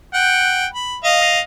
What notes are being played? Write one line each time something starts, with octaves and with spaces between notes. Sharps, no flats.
F#5 G5
B5
D#5 F5